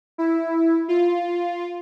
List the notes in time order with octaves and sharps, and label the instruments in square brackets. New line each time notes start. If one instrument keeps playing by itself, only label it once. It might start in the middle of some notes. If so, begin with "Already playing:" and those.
[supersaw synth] E4
F4